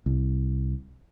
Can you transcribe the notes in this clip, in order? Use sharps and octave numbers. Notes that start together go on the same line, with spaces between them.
C2